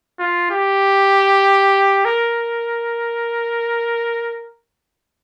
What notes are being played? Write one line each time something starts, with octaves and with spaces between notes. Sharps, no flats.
F4
G4
A#4